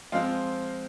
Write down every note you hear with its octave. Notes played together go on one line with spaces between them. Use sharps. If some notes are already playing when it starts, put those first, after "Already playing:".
F3 G#3 C4 F4 F5